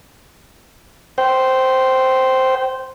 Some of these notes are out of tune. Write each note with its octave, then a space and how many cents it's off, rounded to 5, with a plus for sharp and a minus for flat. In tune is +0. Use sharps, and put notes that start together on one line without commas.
C5 +0 G5 -20